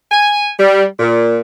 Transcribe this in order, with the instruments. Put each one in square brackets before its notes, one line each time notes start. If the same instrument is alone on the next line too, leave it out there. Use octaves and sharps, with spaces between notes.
[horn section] G#5
G3
A#2